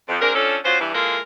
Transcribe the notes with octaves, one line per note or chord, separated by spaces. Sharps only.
F2
A#3 C4 D4 G#4 A#4
F3 C#4 D4 A4
B3 C#4 F4 F#4 C5
G2 E3
E3 G#3 A#3 F4 A4 A#4